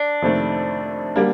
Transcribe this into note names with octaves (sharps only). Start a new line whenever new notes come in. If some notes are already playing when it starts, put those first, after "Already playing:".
Already playing: D4
F2 C3 D#3 A3
D3 G3 A#3